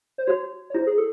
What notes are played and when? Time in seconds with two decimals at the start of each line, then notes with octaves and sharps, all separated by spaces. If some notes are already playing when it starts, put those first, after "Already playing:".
0.18 C5
0.27 F#4 C#5
0.70 C#5
0.74 E4 C5
0.87 G#4
0.98 A4